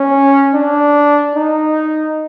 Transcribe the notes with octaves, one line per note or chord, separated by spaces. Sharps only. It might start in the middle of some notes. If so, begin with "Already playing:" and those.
Already playing: C#4
D4
D#4